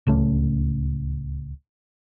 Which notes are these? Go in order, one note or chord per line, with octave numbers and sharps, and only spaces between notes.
D1 C#2 A3 C#4